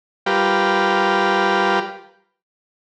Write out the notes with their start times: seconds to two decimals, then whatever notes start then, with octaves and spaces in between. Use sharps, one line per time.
0.26 G3 F4 G4 A#4 B4